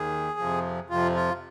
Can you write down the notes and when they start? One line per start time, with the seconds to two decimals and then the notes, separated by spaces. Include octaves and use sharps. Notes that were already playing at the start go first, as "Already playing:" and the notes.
Already playing: D#2 D#3 G#4
0.39 F2 C3 F3
0.90 F2 C3 F3 F4
1.15 F4